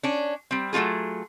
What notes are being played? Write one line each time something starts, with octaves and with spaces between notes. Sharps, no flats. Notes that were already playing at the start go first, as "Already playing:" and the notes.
C#4 D4
G3 C4
F#3 A3 D#4 F4 G#4